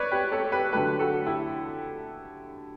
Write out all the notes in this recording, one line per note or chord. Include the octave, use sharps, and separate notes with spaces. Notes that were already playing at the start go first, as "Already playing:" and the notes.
Already playing: B4 C#5 D5
G4 B4
A4 C#5
G4 B4
D3 F#3 A3 G4 B4
F#4 A4
E4 G4